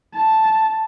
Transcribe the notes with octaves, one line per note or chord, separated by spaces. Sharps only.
A5